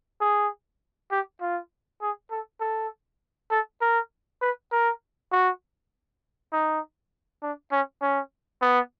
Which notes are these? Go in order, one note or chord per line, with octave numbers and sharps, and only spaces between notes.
G#4
G4
F4
G#4
A4
A4
A4
A#4
B4
A#4
F#4
D#4
D4
C#4
C#4
B3